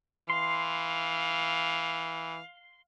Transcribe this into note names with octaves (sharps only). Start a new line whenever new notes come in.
E3 F5 C6